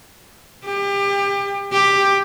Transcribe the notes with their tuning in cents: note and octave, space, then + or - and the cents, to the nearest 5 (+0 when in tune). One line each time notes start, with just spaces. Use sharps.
G4 +30
G4 +10